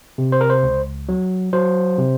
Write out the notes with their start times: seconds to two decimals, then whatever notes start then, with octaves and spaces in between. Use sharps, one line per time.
0.18 C3
0.32 C5
0.41 A#4
0.50 C5
0.63 C#2
1.09 F#3
1.53 F#3 C5
1.98 C3